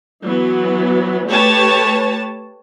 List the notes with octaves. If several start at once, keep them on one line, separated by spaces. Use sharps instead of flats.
E3 F#3 B3
A3 G4 B4 C#5 A5